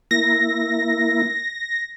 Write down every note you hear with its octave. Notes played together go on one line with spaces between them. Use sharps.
A#3 E4 A#6